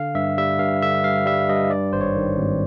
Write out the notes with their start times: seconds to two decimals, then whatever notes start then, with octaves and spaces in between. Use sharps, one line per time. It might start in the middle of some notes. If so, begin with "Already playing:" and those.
Already playing: D3 F5
0.15 G2 E5
0.38 G3 E5
0.59 G2 F5
0.82 D3 E5
1.04 G2 F5
1.26 G3 E5
1.49 G2 D#5
1.70 G2 D5
1.93 G#1 C5
2.01 C#5
2.16 D#3
2.37 G#1